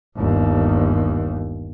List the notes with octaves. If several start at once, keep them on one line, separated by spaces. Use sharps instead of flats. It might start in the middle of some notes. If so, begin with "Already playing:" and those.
G1 D#2